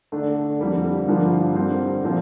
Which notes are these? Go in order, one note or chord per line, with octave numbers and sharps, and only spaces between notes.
D3 A3 D4
F2 D3 G3 A#3
G2 D3 F3 A#3 F4
D3 G3 C4
A#2 F3 C4 F4